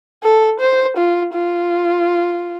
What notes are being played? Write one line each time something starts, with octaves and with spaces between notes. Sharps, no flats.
A4
C5
F4
F4